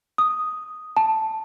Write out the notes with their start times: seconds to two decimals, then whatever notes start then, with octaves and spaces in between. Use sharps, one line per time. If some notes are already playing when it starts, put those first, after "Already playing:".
0.18 D#6
0.97 A5